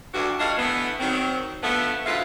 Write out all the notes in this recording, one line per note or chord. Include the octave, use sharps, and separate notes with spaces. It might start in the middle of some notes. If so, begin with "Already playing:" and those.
D2 G2 E3 D4 F#4
G3 D4 A#4 C#5 D#5 F5
D3 E3 A3 B3
D#3 F#3 C4
D3 F3 A3 B3
D2 G#2 F4 B4 E5 F5